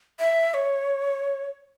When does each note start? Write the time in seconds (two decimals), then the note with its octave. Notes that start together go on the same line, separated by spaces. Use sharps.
0.20 E5
0.54 C#5